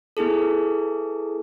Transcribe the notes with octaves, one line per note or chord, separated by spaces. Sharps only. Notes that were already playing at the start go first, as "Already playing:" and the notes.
B3 E4 G#4 A4